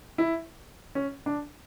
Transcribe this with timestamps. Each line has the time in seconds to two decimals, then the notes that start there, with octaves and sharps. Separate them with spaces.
0.18 E4
0.95 C#4
1.26 D4